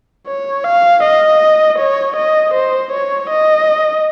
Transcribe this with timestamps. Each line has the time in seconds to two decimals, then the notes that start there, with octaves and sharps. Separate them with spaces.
0.27 C#5
0.64 F5
1.03 D#5
1.78 C#5
2.16 D#5
2.54 C5
2.91 C#5
3.30 D#5